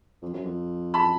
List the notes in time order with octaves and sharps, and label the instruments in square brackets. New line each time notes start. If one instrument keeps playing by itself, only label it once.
[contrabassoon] F2
F#2
F2
[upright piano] A5 B5